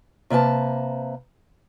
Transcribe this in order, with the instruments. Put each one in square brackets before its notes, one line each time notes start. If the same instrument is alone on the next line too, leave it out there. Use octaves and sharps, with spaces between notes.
[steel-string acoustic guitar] C3 A#3 B4 A5